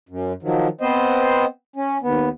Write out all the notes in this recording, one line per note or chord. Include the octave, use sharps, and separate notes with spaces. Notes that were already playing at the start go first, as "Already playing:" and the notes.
F#2
D#3 F3 F#3
B3 C4 C5 D#5
C#4
D#2 B3